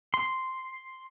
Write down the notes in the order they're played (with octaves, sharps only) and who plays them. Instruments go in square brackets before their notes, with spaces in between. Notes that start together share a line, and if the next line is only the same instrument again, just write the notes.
[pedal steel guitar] C6